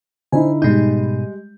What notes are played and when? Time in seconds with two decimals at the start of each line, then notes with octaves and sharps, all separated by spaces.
0.32 D3 D#4 E4 C5 G#5
0.62 G#2 B2 G3 G#3 D#4 G6